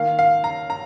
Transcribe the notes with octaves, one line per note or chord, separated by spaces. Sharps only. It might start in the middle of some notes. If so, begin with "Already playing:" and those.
Already playing: D#3 A#3 F5
F5
A#5
A#5